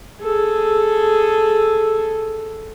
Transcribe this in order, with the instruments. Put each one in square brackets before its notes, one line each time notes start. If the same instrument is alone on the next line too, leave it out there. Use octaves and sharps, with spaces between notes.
[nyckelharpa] G#4 A4